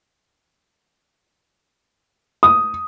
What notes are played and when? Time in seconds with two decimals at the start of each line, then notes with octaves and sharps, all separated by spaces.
2.43 D#6